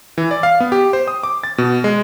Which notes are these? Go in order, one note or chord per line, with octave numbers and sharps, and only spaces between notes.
E3
D5
F5
B3
G4
C5
D#6
D6
A6
B2
G#3